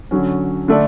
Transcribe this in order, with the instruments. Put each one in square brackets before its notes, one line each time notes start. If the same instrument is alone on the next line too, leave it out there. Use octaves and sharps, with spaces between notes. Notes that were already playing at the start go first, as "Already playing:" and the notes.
[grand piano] D3 F#3 C#4
D3 A3 D4 A4 D5